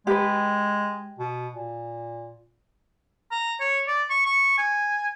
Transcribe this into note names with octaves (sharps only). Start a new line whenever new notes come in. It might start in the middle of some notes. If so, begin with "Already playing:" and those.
G#3 G4 B4
B2
A#2
A#5
C#5
D5
C#6
C#6
G#5